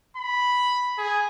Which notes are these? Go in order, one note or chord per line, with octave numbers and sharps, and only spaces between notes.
B5
G#4